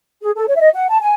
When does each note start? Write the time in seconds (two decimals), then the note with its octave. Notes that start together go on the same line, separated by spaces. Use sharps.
0.22 G#4
0.35 A4
0.48 C#5
0.56 E5
0.61 D#5
0.73 F#5
0.89 A5
1.00 G#5